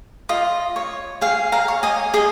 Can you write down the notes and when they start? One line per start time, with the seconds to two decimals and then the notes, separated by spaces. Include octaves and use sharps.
0.29 F4 D#5
0.76 C#5
1.21 G#4 F5
1.52 F5 A#5
1.68 C#5
1.83 D#5 G#5
2.14 G#4 D#5 G#5